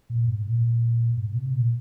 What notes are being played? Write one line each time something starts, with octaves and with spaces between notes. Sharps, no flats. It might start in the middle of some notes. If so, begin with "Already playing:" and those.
A#2
G#2
A#2
G#2
A#2
C3
A#2